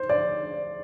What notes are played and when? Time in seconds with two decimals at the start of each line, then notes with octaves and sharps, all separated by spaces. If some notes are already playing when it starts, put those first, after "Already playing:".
Already playing: C5
0.09 D5